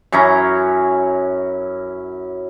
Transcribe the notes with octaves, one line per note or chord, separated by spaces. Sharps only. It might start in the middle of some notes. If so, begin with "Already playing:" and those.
F#2 C#4 E4 A#5